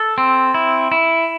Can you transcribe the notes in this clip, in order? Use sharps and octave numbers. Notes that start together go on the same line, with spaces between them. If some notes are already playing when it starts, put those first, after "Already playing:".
Already playing: A4
C4
E4
E4